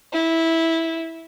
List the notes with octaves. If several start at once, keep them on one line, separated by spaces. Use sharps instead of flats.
E4